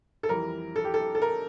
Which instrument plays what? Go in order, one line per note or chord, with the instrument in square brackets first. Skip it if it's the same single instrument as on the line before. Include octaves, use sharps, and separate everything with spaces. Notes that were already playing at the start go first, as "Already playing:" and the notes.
[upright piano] A4
F2 E3 G3 A#4
A4
G4
A4
A4
A#4